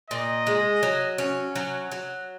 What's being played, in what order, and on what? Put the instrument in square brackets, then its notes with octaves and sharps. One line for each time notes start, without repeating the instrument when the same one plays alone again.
[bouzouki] A#2 [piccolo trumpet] D#5
[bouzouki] G#3
F#3
C#4
F#3
F#3